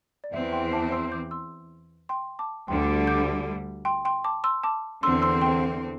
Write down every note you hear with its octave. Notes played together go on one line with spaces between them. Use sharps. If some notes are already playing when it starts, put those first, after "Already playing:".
D5
E2 E3 C4 E5
G5 C6
A5 D6
C6 E6
D6 G6
C6 E6
G5 C6
A5 D6
D2 D3 G3 G5 C6
D6 G6
G5 C6
G5 C6
A5 D6
C6 E6
A5 D6
E2 D3 C4 C6 E6
C6 E6
G5 C6